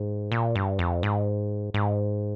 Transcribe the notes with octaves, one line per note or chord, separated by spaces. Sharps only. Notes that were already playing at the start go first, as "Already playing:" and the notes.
Already playing: G#2
A#2
G2
F2
G#2
G#2